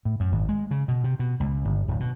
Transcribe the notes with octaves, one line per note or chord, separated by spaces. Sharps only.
A2
F#2
G#1
G#3
C#3
B2
C3
B2
C#2
G1
D1
B2